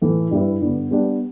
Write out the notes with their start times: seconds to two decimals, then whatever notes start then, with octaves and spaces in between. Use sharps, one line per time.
0.02 A2 E3 A3
0.31 G2 G3 E4 B4
0.61 G2 D3 B3
0.91 G3 B3 D4 G4